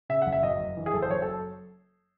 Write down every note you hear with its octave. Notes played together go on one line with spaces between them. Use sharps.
C#3 E5
F#5
F#1
E5
F#2 D#5
F#1
E3
G#4
F#1 A4
C5
F#2 C#5
A4